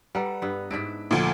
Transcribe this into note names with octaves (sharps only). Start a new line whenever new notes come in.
G3 A4 B4 F#5 A#5
G2 B3
G#2 D4 E4 B6 D7
D2 A#2 F3 A3